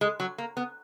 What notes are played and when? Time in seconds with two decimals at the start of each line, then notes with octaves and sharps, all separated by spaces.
0.01 G#3
0.20 F#3
0.38 A#3
0.57 B3